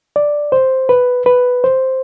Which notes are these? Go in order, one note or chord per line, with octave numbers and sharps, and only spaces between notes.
D5
C5
B4
B4
C5